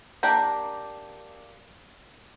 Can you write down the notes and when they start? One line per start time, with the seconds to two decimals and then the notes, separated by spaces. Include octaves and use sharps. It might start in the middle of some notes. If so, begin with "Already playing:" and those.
0.23 A#3 D4 G4 A#5